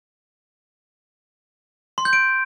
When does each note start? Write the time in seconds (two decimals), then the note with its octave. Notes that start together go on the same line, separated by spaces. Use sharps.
1.98 C6
2.05 G6
2.13 D7